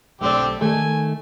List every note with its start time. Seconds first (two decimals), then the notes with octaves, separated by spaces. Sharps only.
0.21 B1 D3 A3 C4 G4 D5
0.61 D#3 A3 A4 G#5